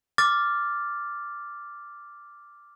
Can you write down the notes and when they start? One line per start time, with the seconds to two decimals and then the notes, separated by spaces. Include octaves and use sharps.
0.18 D6 F6 A6